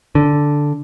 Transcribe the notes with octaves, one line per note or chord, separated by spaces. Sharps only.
D3